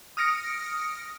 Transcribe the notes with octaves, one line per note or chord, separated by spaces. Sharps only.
D#6 F6 A#6 C#7 D7